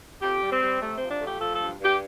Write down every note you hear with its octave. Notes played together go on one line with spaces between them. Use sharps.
F2 G4
G3
C4
G3
C3 A3
F3 C4
D4
A3 G4
F3 A4
G2 A4
G2 G4